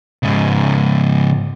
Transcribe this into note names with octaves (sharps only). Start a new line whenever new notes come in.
G#2 C#3